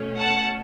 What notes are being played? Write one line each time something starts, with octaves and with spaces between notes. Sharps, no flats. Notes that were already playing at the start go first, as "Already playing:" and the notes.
Already playing: B2 A3 C#4
F#5 A5